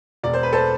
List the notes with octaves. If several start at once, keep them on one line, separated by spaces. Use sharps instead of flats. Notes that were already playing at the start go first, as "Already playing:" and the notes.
E1 D5
C5
B4
A4 C5